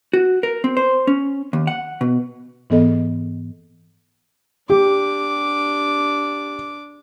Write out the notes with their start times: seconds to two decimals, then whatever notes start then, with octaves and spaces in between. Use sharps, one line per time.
0.13 F#4
0.43 A#4
0.64 C4
0.77 C5
1.07 C#4
1.53 D#2
1.67 F#5
2.01 B2
2.70 G#2 E3 B3 A4 D#5
4.70 D4 G4 D6